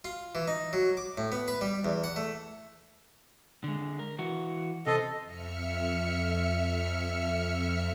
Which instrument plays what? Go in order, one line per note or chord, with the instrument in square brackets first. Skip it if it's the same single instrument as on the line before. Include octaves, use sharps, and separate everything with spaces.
[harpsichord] F4
E3
D#4
F#3
D6
A2
B3
B4
G3
E2
F#5
A3
[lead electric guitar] D3 G#3
A#4
E3 F#4
[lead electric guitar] C3 C5 [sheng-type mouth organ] A4 D#5
[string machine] F2 E5 F6 C#7